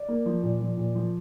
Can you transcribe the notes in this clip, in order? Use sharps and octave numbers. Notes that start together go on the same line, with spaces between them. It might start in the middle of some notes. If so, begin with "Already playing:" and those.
Already playing: D5
A#3
F3
A#2
F3
A#2
F3